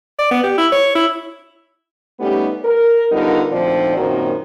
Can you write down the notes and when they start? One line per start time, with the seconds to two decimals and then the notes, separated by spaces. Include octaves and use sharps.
0.19 D5
0.31 B3
0.43 G4
0.58 E4
0.72 C#5
0.95 E4
2.20 G3 A3 B3 C#4 D#4 G4
2.65 A#4
3.12 D3 G3 B3 D#4 F4 A#4
3.52 D2 A#2 F3 C4 D#4 D5
3.97 F#2 A#2 D#3 A#3 C4 F#4